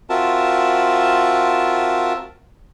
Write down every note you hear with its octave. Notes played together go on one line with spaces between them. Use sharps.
C4 F4 F#4 A#4 E5 A5